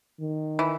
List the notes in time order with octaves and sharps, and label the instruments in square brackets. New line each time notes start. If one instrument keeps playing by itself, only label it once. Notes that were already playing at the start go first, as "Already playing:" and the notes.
[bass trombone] D#3
[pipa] E3